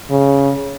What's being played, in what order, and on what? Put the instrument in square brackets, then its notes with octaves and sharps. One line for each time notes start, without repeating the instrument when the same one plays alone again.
[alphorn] C#3